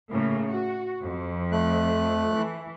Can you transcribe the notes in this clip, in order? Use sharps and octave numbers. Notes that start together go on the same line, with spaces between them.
A2 C#3 A#3
F#4
F2
A3 F#6
E3